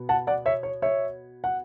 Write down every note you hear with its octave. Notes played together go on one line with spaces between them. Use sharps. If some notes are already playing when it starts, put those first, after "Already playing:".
Already playing: B2 B3
F#5 A5
D5 F#5
C#5 E5
C#5
C#5 E5
F#5